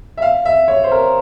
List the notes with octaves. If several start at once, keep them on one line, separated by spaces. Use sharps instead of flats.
E5
F5
E5
C#5
C5
A#4